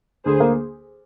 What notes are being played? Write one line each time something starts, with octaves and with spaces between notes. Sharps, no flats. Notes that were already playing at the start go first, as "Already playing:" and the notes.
D2 G#4 C5
A#3